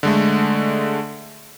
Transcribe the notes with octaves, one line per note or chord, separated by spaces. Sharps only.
D3 G#3 A3